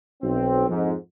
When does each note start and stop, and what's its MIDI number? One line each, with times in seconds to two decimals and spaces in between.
0.23 0.65 35
0.23 0.65 60
0.69 0.94 41
0.69 0.94 44